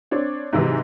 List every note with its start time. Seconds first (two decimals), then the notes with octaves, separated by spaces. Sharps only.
0.11 C4 D4 C#5
0.53 G#2 C3 E3 F#3